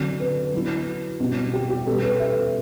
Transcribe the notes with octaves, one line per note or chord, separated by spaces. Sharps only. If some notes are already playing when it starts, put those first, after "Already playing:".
Already playing: D3 F#3 C4
B4
F#3 B3 E4
B2 G3 C4 F#4
G4
G4
B2 G3 B3 A4
B4
E5